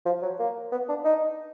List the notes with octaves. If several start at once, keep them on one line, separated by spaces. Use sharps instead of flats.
F3
F#3
A#3
B3
D4
D#4